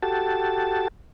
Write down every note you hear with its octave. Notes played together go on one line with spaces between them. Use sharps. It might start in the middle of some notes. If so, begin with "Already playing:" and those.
F#4 G4 A4 A5